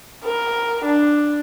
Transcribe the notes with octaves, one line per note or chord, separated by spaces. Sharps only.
A#4
D4